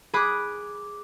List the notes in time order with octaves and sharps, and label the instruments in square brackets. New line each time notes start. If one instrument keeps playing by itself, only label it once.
[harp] G#4 B5 D6 D#6 F#6